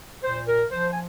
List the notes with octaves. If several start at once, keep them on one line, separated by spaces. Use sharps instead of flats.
A#2 C5
A#4
F3 C5
G#5